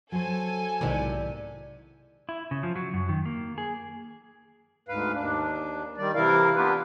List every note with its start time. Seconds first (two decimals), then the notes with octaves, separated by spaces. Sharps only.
0.12 F#3 A4 C5 G#5
0.81 B1 G#2 C3 D#3 D4 E4
2.29 E4
2.51 C#3
2.63 F3
2.76 F#3
2.94 F#2
3.09 D#3
3.25 A#3
3.58 G#4
4.88 D2 G#2 B4 F5
5.14 D#2 D4
5.97 D#3 G3 D5
6.15 C3 E3 E4 A#4 F5
6.56 A#3 B3 D4 F4 G4 B4